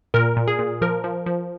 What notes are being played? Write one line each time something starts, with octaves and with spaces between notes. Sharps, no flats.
A#2 A#4
A#2
G#4
A#2
F3 A#4
F3
F3